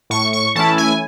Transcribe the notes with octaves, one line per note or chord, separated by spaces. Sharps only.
A2 C#6
C#6
E3 A3 C#4 E4 A5
G#5